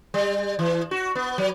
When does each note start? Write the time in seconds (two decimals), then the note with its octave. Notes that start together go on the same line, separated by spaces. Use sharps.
0.14 G3
0.59 E3
0.91 F#4
1.15 B3
1.38 F#3